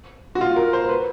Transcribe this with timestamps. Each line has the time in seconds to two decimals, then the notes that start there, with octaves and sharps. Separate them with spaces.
0.35 F#4
0.41 F4
0.56 A#4
0.73 C5
0.89 B4